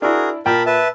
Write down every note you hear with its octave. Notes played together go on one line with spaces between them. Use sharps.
D4 E4 F#4 G#4 A#4
A#2 A#4 G5 A5 B5
B4 E5 A5